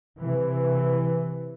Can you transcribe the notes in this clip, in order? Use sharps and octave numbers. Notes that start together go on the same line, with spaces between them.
C3 E3